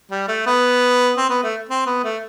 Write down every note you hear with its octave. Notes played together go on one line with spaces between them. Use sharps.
G3
A3
B3
C4
B3
A3
C4
B3
A3